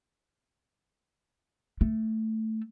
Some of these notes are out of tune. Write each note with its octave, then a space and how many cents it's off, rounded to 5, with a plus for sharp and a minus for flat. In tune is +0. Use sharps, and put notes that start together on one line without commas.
A3 +5